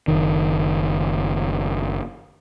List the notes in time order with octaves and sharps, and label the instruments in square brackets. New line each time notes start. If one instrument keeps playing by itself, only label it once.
[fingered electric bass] F#1 D#3